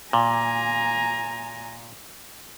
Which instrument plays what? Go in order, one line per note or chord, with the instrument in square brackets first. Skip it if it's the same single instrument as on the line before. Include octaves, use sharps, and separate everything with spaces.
[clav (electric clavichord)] A#2 [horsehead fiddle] G#5 A#5